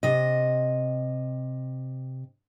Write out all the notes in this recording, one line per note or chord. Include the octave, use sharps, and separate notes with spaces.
C3 D#5